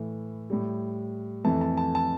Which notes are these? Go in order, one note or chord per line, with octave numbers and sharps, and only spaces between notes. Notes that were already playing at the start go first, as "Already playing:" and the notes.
Already playing: A2 E3 A3
A2 G3
F2 E3 A3 A5
A5
A5
A5